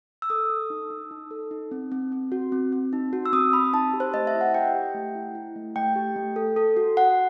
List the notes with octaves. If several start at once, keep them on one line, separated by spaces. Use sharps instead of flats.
E6
A4 D#6
A4
D#4
D#4
D#4
A4
D#4
C4
C4
C4
F#4
C4
C4
D#4
F#4
E6
C4 D#6
C4 B5
D#4 A5
G4
C5
A3 D#5
E5
E4
F#5
G4 G5
G4
A3
E4
E4
A3
A3 G5
G4
A3
A4
A4
F#4
F#4 F#5